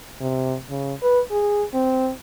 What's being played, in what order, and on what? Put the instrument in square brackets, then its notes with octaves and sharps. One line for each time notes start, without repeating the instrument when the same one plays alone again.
[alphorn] C3
C#3
B4
G#4
C4